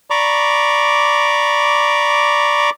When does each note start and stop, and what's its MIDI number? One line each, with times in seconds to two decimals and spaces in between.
0.10 2.70 74
0.10 2.70 82
0.10 2.70 83
0.10 2.70 85
0.10 2.70 86